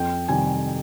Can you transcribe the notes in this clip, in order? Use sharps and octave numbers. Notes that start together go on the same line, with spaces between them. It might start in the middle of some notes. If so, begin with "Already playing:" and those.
Already playing: F2 G5
C3 D#3 G3 G#5